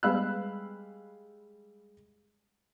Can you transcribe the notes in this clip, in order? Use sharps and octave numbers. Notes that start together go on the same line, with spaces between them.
G3 G#3 F5 B5 E6 F#6